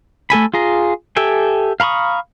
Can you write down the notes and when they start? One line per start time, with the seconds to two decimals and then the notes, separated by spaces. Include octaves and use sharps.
0.30 A3 A4 G#5 B5
0.54 F4 G#4 A#5
1.17 G4 A4 E5 G5 G#5
1.80 F5 A#5 B5 C#6 D#6